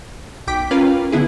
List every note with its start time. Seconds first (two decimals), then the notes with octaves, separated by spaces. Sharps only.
0.47 B1 G5 D6 B6
0.71 C#4 F4 A#4 B4 F5
1.12 D3 B3 E4 G#4